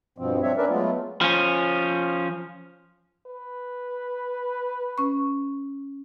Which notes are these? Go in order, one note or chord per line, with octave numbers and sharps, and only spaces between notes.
G2 B2 F3 C4
C4 D4 C#5 E5
C#4 D4 A#4 B4 D5 E5
F#3 G#3 A3 B3 F4
F3 C#4
B4
C#4 C#6